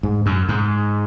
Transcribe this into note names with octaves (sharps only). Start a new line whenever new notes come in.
G#2
F#2
G#2